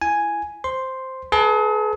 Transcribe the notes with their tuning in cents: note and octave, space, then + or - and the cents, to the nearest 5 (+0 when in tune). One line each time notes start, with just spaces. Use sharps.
E4 +20 G#5 +0
C5 +0 C6 +0
G#4 +40 B4 +0 A5 +20